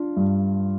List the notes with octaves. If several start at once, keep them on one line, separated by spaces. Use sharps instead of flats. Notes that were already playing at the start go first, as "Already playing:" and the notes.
Already playing: D4 F4
G2